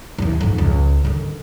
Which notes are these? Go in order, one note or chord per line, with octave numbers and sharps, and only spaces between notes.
D#2 E3
F2 G#2
C#2
D3 D#3